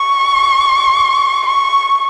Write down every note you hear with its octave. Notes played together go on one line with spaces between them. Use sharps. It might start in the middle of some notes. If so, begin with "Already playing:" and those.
Already playing: C#6
C#6